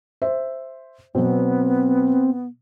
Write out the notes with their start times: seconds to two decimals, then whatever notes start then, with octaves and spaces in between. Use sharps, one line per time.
0.22 C5 E5
1.15 B2 F#3 B3 C4